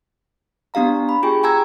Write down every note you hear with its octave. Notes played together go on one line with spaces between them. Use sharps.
B3 D4 G4 F5 A#5
B5
F4 G4 G#4 G5 G#5 C#6
G5 G#5 A#5 E6 G#6